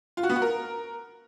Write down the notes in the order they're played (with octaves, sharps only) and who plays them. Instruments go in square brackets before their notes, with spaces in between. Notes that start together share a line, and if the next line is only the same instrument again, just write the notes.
[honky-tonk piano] F4
F#4
B3
F#4
A#4